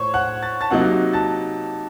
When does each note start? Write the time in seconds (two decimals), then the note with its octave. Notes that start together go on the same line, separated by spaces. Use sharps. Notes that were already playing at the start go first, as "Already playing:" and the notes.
Already playing: A2 C5 C#5 C#6
0.14 F#5 F#6
0.43 A6
0.61 A5 A6
0.70 C3 F#3 A#3 D#4 F#5 F#6
1.13 A5 A6